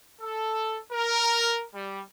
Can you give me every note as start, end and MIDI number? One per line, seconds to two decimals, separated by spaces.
0.21 0.78 69
0.91 1.64 70
1.73 2.00 55